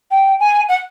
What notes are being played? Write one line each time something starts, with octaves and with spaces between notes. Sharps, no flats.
G5
G#5
F#5